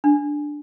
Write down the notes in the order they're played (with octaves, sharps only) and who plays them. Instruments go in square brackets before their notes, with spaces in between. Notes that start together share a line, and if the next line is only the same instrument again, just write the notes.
[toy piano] D4